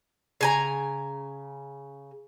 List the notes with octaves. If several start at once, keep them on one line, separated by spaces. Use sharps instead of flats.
C#3 G#5 A#5